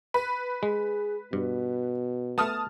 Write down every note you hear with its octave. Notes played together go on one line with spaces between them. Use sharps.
B4
G#3 G#4
G2 B2
A3 B3 A5 D#6 F6